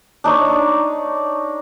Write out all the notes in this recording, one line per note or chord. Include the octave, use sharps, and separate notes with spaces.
D4 D#4 C#5 D5